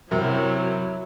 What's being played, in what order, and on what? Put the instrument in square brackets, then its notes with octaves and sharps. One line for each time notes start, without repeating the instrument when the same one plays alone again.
[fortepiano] F#2 C3 A#4 [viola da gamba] F#3 E4